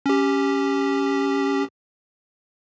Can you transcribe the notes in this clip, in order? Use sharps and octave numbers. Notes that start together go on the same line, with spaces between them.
C#4 G4